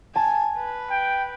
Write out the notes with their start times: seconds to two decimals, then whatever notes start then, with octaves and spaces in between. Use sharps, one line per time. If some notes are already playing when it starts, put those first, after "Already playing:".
0.16 G#5 A5
0.56 B4
0.90 G5